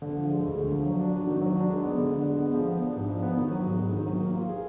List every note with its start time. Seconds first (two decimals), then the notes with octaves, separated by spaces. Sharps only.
0.02 D3
0.17 F3
0.30 G#3
0.44 D2
0.58 D3
0.72 F3
0.86 F#3
0.99 D4
1.14 F#4
1.27 D#3
1.41 F#3
1.56 D4
1.70 G#3
1.84 B3
1.98 D3
2.11 D3
2.25 G#3
2.39 B3
2.54 F3
2.67 B3
2.82 D4
2.96 G#2
3.09 F3
3.23 B3
3.37 D#3
3.51 F#3
3.64 G#2
3.79 G#2
3.93 D#3
4.06 F#3
4.20 A#3
4.34 F4
4.49 G#4